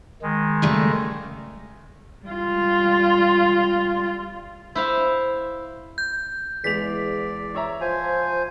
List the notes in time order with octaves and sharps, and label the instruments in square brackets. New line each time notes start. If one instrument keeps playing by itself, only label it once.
[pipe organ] D#3 G#3
[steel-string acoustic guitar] C#3 G3 A3
[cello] G3 F4
[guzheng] E4 C5 F5
[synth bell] G6
[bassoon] E2 [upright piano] E3 G#3 F7 [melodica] D5 [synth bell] B6
[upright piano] C#5 E5 A#5
[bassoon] F3 [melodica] C5 G#5